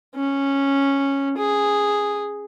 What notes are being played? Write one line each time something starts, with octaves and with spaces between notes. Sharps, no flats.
C#4
G#4